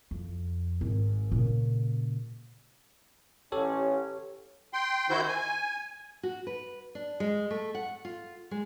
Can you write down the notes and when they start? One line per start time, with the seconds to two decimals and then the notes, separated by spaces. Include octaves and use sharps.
0.11 F2
0.81 G#1
1.31 A#2 C#3
3.52 A1 C#4 G4 A4 C#5
4.73 G5 C6
5.10 D#3 E4 F#4 C5 G6
5.28 G#5
6.23 F#4
6.47 B4
6.95 D4
7.20 G#3
7.50 A3
7.75 F#5
8.05 F4
8.51 G#3